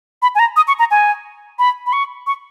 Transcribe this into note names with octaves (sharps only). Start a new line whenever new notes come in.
B5
G#5
A#5
D#6
C#6
A#5
G#5
B5
B5
C#6
C#6